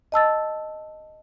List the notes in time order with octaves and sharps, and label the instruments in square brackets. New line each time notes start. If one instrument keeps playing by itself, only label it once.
[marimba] D#5 A5 E6 A6